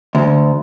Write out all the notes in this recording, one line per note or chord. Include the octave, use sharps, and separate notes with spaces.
D2